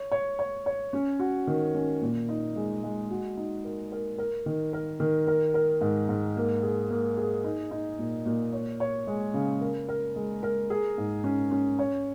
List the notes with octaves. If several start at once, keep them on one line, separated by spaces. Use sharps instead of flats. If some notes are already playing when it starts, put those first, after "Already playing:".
Already playing: C#5
C#5
C#5
C#5
C#4
F#4
D#3
C#4
A#2
D#4
G#3
G#3
F#4
D#4
A#4
A#4
A#4
D#3
A#4
D#3
A#4
A#4
G#2
G#2
A#3
G#4
A#3
G#4
D#4
D#4
A#2
A#2
C#5
C#5
G#3
C#3
A#4
A#4
G#3
A#4
G#4
G#2
C#4
C#4
C#5